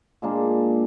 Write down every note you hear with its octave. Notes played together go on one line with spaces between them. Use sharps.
A#2 G#3 A#3 D4